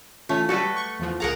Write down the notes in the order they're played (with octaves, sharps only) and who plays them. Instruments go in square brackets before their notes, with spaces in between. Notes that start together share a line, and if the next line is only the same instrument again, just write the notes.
[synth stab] E3 C#4 F4 [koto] A3
[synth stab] F#3 G3 [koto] F#4 A4 B4
[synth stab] C#6
E2 F3
[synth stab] C#2 G#4 F5 [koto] A#4 F#5 A#5